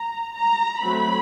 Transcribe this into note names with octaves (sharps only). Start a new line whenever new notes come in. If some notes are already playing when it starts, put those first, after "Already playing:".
Already playing: A#5
A#5
F#3 A3 C4 B5